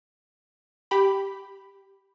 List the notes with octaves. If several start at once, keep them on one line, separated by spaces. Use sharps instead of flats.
G4 B5